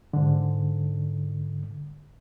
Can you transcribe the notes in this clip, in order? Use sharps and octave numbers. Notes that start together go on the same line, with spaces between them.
G#2 D3